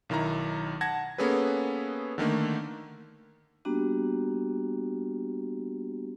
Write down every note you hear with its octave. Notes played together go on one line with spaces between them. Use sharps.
B1 D#3 E4 A#5
F#5 A5 G#6 A#6
A#3 B3 C#4 G#4 A4 B4
D3 D#3 A3 A#3
G3 A#3 B3 D4 F#4 G4